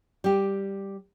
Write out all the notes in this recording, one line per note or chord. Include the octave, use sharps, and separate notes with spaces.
G3 G4